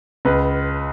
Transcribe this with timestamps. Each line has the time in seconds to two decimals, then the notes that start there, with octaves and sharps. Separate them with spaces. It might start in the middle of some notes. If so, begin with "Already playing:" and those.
0.25 C#2 B4